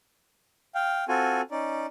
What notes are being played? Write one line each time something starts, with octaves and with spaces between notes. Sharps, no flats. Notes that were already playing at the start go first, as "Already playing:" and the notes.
F5 G5
C4 F4 F#4 A4 G#5
C#4 D#4 D5